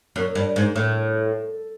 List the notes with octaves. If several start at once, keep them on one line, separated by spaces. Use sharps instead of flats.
F#2
G2
G#2
A2